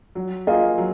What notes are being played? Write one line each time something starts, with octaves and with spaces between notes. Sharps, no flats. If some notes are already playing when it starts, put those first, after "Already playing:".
F#3
A#3 F4 G#4 D#5
F#3